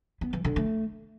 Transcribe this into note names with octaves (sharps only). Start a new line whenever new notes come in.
B3
E3
D3
A3